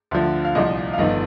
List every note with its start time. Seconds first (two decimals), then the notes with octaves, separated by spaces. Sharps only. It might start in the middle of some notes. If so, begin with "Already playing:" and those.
0.11 D2 D3 F3
0.45 F5
0.55 C2 A#2 F3 D#5
0.93 F5
0.98 G1 F2 D#3 D#5